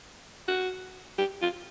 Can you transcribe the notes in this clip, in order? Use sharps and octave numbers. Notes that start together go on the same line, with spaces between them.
F#4
G4
F4